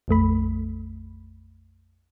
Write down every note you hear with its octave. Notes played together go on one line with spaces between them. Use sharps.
A#1 F2 A3 B5